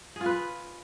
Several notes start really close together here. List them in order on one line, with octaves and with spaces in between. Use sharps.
G#4 F4 B4